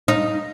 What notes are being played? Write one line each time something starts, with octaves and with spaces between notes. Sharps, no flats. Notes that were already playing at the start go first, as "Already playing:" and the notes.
D#4